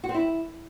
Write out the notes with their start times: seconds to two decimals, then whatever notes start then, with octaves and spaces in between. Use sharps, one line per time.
0.04 F#4
0.09 C4
0.14 E4